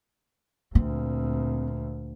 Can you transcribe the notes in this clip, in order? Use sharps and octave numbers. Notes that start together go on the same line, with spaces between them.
D2 A#2 C4